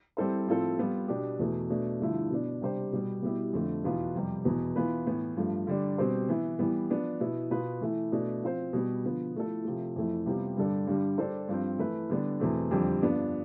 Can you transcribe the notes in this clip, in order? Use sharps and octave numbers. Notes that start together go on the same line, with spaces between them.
G3 C4 E4 A4 C5
A2 F3 C4 F4 A4
G3 B3 F4
B2 B3 D4 G4
E2 B2 A3
B2 A3 D4
G2 D3 F3 A3 E4
B2 B3 D4
C3 G3 D4 G4 C5
B2 G3 B3
B2 G3 B3 E4 G4
F2 D3 A3
E2 B2 B3 F4 B4
F2 C3 G3
E2 B2 B3
E3 B3 F4 B4
A2 E3 B3
G2 F3 A3
D3 G3 D4
B2 G3 C4 G4 C5
E3 B3 E4
E3 G3 B3
F3 B3 D4
B2 B3 E4
B2 B3 F4 B4
E3 A3 E4
B2 A3 D4
F3 C4 F4 C5
B2 G3 B3
D3 F3 B3
F3 A3 E4 A4
C3 F3 A3
F2 E3 A3 E4
C3 G3 B3 F4
G2 D3 G3 D4 A4
G2 D3 G3
G3 D4 A4 C5
G2 F3 C4
E3 A3 E4 B4
D3 G3 B3 D4
E2 B2 A3 C4
F2 D3 G3 C4 G4
G2 F3 B3 D4